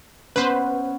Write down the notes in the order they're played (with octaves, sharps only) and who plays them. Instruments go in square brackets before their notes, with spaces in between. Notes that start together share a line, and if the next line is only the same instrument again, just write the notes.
[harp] B3 C#4 [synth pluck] B4 C5